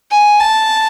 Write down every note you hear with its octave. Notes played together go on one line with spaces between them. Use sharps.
G#5
A5